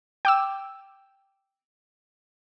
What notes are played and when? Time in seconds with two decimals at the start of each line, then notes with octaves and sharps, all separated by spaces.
0.25 G5 D6 E6